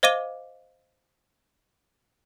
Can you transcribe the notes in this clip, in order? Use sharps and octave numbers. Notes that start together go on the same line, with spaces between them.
C5 D#5 F5 D6 D#7 G7